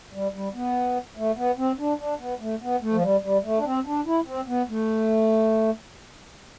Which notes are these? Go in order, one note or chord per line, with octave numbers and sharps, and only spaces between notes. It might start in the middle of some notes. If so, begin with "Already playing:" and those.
G3
G3
B3
A3
B3
C4
D4
D4
B3
A3
B3
A3
F3
G3
G3
A3
D4
C4
D4
E4
C4
B3
A3